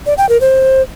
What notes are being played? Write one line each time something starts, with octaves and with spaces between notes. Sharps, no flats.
D5
G5
A#4
C5